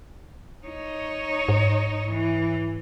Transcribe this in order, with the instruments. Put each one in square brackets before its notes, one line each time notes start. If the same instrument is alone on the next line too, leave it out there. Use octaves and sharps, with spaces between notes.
[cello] D#4 C#5
[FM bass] G#2
[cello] E3